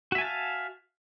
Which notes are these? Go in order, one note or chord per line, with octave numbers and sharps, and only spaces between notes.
F#4 E5 F5 G#5 A5